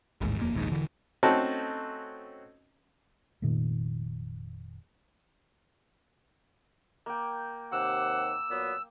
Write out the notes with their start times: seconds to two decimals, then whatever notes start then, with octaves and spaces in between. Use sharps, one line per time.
0.21 A1 D#2 G#2
0.37 D#1 F2 A#3
0.54 D#1 A#1 D#2 G#2
0.72 E1 D3 E3
1.23 A3 C4 C#4 D#4 F#4 A5
3.42 F1 F2 A#2 D#3
7.06 A#3 G5
7.72 D#2 C3 F#5 D6 E6
8.50 A#2 F#3 B3